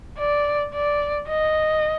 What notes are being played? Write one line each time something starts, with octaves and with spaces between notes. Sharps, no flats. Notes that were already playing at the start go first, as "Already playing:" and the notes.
D5
D5
D#5